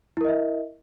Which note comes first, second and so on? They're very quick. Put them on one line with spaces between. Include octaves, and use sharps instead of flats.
E4 A#4 D#5 E5